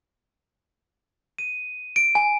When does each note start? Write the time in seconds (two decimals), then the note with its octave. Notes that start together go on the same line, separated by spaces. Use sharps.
1.39 D#7
1.96 D7
2.15 G#5